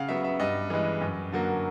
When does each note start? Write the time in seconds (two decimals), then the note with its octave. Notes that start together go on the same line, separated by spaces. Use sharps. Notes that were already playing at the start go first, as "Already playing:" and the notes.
Already playing: C#3 F5 F#5
0.09 F#3 B3 E5
0.24 E5
0.39 G2 D#5
0.70 E3 G#3
1.01 F#2
1.32 D3 F#3 A#3